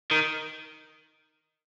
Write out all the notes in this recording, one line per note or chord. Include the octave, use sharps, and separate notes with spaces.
D#3